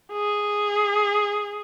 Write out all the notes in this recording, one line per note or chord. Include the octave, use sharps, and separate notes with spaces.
G#4